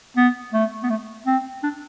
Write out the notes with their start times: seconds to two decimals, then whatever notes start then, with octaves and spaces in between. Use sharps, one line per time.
0.17 B3
0.53 A3
0.83 B3
0.90 A3
1.26 C4
1.63 D4